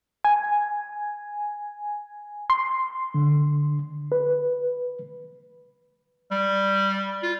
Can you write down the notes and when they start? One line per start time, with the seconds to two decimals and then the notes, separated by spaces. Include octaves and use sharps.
0.25 G#5
2.50 C6
3.14 D3
4.12 B4
6.31 G3
7.23 F4